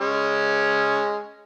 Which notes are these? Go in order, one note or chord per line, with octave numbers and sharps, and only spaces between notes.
G#3 C#4